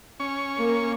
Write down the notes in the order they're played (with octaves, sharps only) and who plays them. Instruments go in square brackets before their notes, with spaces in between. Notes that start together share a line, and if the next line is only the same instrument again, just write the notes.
[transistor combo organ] C#4 C#6
[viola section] A#3